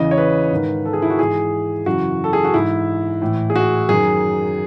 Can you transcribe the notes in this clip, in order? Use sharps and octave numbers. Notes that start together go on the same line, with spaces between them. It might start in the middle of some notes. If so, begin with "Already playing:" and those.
Already playing: E2 C#3 E3 D#5
C#5
B4
G#2 D#3
A4
G#4
E4
F#4
G#2 E3 G#4
F#2 C#3 E3 F#4
A4
G#4
F#4
G#2 E3 E4
A2 E3
G#4
F#4
F#2 D#3 G#4